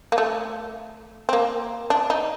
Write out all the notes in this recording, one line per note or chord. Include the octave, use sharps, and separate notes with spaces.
A#3
A3
C4
A#3
D4
D#4